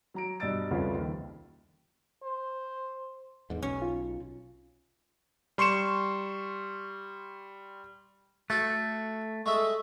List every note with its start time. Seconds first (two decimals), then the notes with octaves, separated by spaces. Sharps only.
0.14 F#3 A#5 D7
0.40 G2 B2 D#5 E6 A6 D7
0.71 C2 F2 C#3 F4 B4 C#5
0.94 D#2 D#3
2.23 C5
3.50 E2 G#2
3.62 B1 C#4
3.82 F4
5.58 G3 C6 C#6 C#7 E7
8.50 A3 F#4 A4
9.46 G#3 A3 E5 C#6